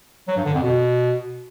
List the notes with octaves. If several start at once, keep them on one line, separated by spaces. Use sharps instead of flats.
F#3
G2
D3
F2
B2